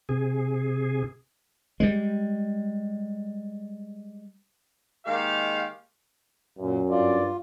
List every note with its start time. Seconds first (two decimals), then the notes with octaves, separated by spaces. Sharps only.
0.09 C3 G#4
1.80 G3 G#3
5.06 D#3 G#3 A#3 G4 F5
6.58 F#2 A#2
6.90 G2 F4 D5